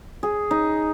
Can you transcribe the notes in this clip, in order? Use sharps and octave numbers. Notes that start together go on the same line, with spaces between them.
G#4
D#4